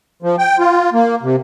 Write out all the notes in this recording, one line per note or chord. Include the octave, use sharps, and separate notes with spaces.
F3
G5
F4
A#3
C3